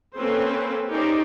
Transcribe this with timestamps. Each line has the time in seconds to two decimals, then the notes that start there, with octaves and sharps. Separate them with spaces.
0.16 A#3 C4 C#4 A4 B4 C5
0.89 C#4 D#4 G4 A#4 C5 D5